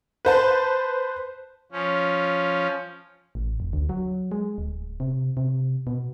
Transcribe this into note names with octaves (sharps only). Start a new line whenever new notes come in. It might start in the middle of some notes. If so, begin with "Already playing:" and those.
B4 C5 A5
F3 C#4
A1
F1
D2
F#3
G#3
D1
C3
C3
B2